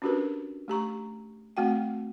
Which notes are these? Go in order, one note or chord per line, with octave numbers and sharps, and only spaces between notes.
C#4 D4 F#4 G4 A#4 B4
A3 G4 A#5 C#6
A3 C4 F#4 F#5 G5